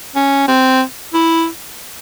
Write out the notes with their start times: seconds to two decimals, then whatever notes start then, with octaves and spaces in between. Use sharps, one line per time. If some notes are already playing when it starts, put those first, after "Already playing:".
0.15 C#4
0.48 C4
1.13 E4